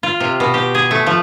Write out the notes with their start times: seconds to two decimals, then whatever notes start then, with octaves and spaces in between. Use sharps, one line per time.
0.03 F4
0.20 C3
0.40 B2
0.54 G4
0.75 G#4
0.91 A3
1.06 F3